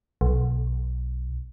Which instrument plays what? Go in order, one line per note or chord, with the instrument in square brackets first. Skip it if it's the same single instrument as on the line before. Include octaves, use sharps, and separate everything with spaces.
[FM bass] B1